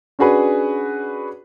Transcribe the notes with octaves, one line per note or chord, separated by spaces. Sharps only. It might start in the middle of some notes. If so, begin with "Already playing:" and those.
C#4 D4 F#4 G#4 B4